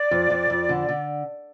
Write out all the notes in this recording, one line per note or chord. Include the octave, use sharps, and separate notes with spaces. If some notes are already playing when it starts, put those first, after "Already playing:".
Already playing: D5
F2
F2
F2
D3
D3